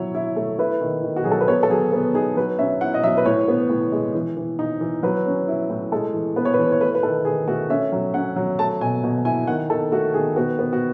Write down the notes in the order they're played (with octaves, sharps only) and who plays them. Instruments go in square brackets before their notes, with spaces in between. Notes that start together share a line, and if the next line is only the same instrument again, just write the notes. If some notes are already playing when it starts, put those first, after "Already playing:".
Already playing: [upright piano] F#3 E4 C#5
E4
A3
E4 B4
D#3
D#3
F#4
F#3 G#4
A4
B4
B3 C#5
A4
F#3 G#4
B3
D#4 G#4
F#3 B4
C#4 E5
E4 F#5
D#5
F#3 E5
B4
A2 C#5
B3
A2
G#3
E3
E3
D#4
E3
F#3 B4
C#4
E4
A2
G#3 A4
E3
B3 B4
C#5
B4
E3
C#5
A3 B4
B4
D#3 A4
D#3 G#4
A3 F#4
C#4 E5
F#3
C#4 F#5
F#3
A3 A5
B2 G#5
B2
E4 G#5
D#3 F#5
D#3 A4
A3 F#4
D#3 G#4
B3 F#4
B3
F#4